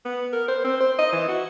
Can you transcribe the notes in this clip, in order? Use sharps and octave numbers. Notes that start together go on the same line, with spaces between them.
B3
A#4
C5
C4
C5
D#5
E3
F#4